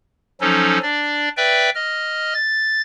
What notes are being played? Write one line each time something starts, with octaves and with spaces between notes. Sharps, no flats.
F3 F#3 C#4 D#4 A4
D4 D5
B4 D5 E5 G5
D#5 F6
A6